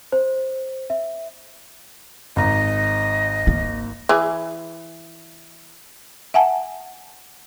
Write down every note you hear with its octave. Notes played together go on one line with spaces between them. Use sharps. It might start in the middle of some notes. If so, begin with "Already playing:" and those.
C5
E5
G#1 D#5 A#5
A#3
E3 G#4
E5 F#5 G#5 A5